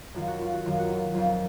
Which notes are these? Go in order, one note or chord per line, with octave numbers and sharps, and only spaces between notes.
F#2 D#3 F#3 F4
F#4
F4
F#4
F#2 D#3 F#3 F4
F#4
F4
F2 D#3 F#3 F4